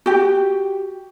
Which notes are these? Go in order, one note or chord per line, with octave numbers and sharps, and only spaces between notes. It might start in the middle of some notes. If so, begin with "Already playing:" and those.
F#4 G4